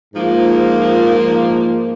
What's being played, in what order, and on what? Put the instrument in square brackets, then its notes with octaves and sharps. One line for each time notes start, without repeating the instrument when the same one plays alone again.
[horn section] G#2 F3 A#3